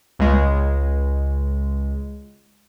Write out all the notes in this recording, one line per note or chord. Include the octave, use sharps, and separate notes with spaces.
C#2 G#3